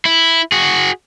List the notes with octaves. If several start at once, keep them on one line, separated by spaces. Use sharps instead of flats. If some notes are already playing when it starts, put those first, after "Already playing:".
E4
F#4 G#4